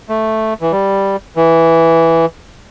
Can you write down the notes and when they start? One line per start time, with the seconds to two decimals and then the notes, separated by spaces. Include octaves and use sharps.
0.09 A3
0.61 E3
0.72 G3
1.36 E3